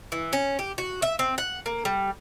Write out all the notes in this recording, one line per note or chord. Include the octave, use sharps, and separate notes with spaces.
E3
C#4
G4
F#4
E5
C4
F#5
A#3
G3